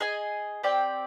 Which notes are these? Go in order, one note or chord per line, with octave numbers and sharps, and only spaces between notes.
G#4 D#5 G#5
C4 G4 D5 G5